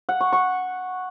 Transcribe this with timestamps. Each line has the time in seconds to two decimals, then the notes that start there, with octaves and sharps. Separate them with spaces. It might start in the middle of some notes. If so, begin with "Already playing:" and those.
0.09 F#5
0.21 C#6
0.33 C#6